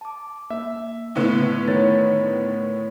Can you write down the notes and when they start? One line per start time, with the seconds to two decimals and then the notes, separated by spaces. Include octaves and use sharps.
0.01 A5 D6
0.50 A#3 E5
1.15 A2 D3 B3
1.68 D#3 C#5 A6